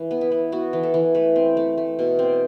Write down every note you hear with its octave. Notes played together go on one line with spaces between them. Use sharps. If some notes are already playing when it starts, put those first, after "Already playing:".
Already playing: E3
B3
E4
B3
B3 F#4
E3
A4
E3
A3 B4
C4
A3
A3
B2
C4